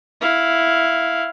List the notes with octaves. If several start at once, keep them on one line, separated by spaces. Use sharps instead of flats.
E4 F5